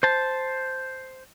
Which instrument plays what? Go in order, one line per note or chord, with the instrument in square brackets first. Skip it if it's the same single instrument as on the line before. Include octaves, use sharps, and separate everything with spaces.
[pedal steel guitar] C5 A5